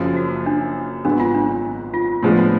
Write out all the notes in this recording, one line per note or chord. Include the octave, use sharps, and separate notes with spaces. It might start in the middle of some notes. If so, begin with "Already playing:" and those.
Already playing: F#1 F#2 F3
F#4
D4
G#1 G#2 F#3 B3 D4 F#4
F4
D4
F4
A2 F3 G#3 B3 D4